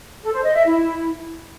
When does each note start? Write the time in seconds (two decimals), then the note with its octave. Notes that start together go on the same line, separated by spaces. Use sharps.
0.23 A4
0.34 C5
0.44 D#5
0.55 E5
0.66 E4